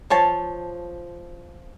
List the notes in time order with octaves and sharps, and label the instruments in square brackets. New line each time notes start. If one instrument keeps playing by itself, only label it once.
[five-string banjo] F3 C#5 A5